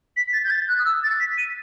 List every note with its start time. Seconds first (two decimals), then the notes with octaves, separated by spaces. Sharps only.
0.16 B6
0.33 A6
0.45 G6
0.50 A6
0.68 F#6
0.79 D#6
0.85 E6
1.03 A6
1.20 B6
1.38 D#7